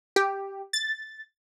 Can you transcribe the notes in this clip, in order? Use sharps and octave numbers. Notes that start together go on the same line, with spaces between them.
G4
A6